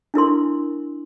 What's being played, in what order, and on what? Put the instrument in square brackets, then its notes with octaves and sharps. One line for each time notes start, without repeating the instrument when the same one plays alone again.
[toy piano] D4 E4 A#4 C6